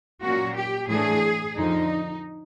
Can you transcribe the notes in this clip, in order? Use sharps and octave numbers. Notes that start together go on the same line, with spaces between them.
A#2 F#3 A#3 C#4 F#4
G4
A2 E3 A3 D4 G#4
F2 D3 F3 D#4